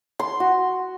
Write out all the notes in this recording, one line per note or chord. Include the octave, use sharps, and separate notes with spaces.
C6
F#4